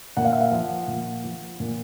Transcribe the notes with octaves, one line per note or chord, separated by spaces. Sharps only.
A#2 F#5
F5
E5
F5
F3 F#5
A#2
F3
A#2